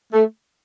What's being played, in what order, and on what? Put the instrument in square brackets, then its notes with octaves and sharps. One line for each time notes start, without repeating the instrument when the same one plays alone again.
[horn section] A3